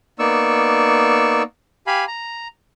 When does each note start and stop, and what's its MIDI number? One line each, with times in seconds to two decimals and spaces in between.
0.19 1.43 58
0.19 1.43 59
0.19 1.43 63
0.19 1.43 74
0.19 1.43 85
0.19 1.43 88
1.87 2.05 67
1.87 2.05 77
1.87 2.05 80
1.87 2.05 83
2.08 2.48 82